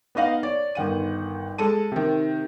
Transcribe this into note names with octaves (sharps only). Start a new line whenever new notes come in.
B3 D#4 D#5 F5 F#5
C#5 D5
G1 D#3 F#5 D#7
G#3 A4 A5 D#7
C3 D#3